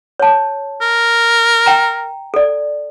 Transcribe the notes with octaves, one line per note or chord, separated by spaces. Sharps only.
C#5 A5
A#4
G5 A#5
A4 D5